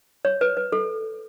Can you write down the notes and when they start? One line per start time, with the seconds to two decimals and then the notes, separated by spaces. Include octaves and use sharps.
0.25 C#5
0.41 B4
0.57 B4
0.72 A4